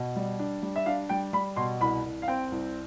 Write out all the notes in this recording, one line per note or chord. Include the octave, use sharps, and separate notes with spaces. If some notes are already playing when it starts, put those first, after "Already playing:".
Already playing: B2
G3
D4
G3
E5
D4 F5
G3 G5
G3 B5
B2 C6
C2 B5
C2
F5
C4 G5
C2